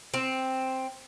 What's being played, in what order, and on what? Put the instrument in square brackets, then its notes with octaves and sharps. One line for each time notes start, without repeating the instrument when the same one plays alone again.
[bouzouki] C4